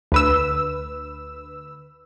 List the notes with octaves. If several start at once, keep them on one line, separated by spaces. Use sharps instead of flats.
D2 B4 E6